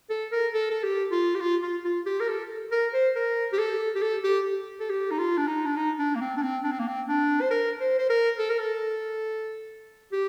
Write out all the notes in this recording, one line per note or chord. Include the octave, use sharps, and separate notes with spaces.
A4
A#4
A4
A4
G4
F4
G4
F4
F4
F4
G4
A#4
A4
A#4
C5
A#4
G4
A4
G4
A4
G4
A4
G4
D#4
F4
D4
D#4
D4
D#4
D4
A#3
C4
D4
C4
D4
C4
A#3
C4
D4
C5
A#4
C5
C5
A#4
A4
A#4
A4
G4